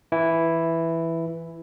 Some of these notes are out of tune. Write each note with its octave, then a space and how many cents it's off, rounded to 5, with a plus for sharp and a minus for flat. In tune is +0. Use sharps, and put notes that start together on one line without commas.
E3 +0 E4 +0